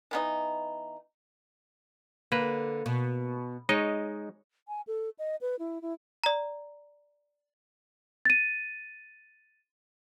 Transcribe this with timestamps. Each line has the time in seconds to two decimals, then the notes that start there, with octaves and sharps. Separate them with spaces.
0.11 E3 B3 D#4
2.32 D3 A#3 B4
2.86 B2
3.69 G#3 D#4 C#5 D#5
4.68 G#5
4.87 A4
5.19 D#5
5.41 B4
5.59 E4
5.82 E4
6.24 D5 A#5
8.25 A6 D#7